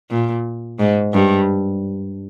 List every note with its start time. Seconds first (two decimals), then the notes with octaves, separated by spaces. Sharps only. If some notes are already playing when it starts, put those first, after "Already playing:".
0.10 A#2
0.79 G#2
1.13 G2